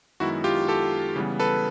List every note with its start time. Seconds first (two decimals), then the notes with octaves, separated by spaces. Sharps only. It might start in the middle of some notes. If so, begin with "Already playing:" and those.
0.20 F#2 D#3 G#3 B3 E4 F#4
0.44 F4 G4
0.68 G4 A4
1.16 C#3 E3 G3 B3
1.40 A4 B4